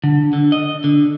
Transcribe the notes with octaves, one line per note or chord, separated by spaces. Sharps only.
D3
D3
D#5
D3